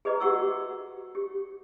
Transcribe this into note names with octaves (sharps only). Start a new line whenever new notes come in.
G#4 B4 C5 D#5 A#5 D6
F#4 G4 F#5 C#6 E6
G4